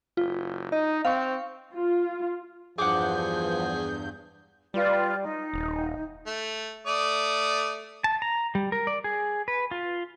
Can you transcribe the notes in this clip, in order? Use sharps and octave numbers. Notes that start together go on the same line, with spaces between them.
F#1 F4
D#4 D#5
C4 F5 C#6
F4
E2 G2 F3 G#4 F#5 D6 G6
G3 F4 B4 D5
D#4
D#1
A3
A3 D5 D#6
A5
A#5
G3
A#4
D5
G#4
B4
F4